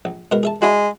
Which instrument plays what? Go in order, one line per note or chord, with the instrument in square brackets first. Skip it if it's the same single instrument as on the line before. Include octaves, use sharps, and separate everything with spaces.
[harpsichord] A#1
B2 G#3 A#4
G#4 E5 A5
[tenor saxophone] G#3 [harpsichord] D4 E4 F#4